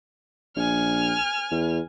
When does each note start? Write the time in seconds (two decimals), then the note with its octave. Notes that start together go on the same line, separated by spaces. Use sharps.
0.56 A#1 G#5 F6
1.51 E2